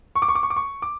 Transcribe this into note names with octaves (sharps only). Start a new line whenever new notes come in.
C#6
D6
C#6
D6
C#6
D6
C#6
D6